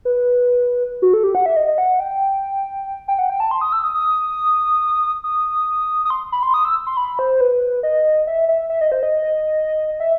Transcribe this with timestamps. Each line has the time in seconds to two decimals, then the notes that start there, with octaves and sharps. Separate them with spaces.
0.05 B4
1.02 F#4
1.14 A4
1.24 G4
1.35 F#5
1.46 E5
1.56 D#5
1.67 D#5
1.78 F#5
2.00 G5
3.08 G5
3.19 F#5
3.30 G5
3.40 A5
3.51 C6
3.61 D#6
3.72 E6
3.84 D#6
3.94 D#6
5.24 D#6
6.05 D#6
6.10 C6
6.32 B5
6.43 C6
6.54 D#6
6.65 E6
6.87 C6
6.97 B5
7.19 C5
7.41 B4
7.83 D#5
8.27 E5
8.49 E5
8.70 E5
8.81 D#5
8.92 C5
9.03 D#5
10.00 E5